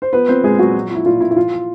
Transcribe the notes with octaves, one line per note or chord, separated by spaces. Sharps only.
C5
F3 B3 B4
F3 C4 C5
A#2 G#3 G#4
A#2 F#3 F#4
F3
F3 E4
A#2 F4
A#2 E4
E4
F3 F4
F3